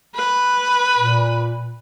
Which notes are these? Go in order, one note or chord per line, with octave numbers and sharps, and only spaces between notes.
B4
A#2